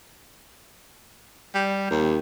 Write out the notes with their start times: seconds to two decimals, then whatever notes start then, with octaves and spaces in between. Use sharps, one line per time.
1.55 G3
1.91 D#2